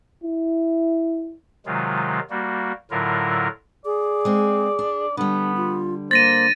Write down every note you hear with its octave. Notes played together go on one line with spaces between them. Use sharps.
E4
C3 D#3 F#3 G#3 F4
G3 A#3 F#4
A2 D3 F#3 E4 F4 A#4
G#4 D5
G#3 C4
D4
D3 G3 B3 D4
F4
A#3 C5 A6 A#6 D#7